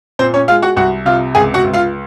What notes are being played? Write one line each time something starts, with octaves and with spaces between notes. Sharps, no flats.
A#2 C4 C5
C#4 C#5
G#3 F4 F5
F#4 F#5
C2 F#4 F#5
C3 F4 F5
C#2 G#4 G#5
F#4 F#5
C#2
F4 F5